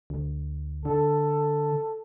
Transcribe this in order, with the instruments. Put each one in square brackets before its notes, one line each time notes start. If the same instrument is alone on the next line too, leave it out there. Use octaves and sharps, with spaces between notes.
[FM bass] D2
[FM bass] D3 [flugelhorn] A4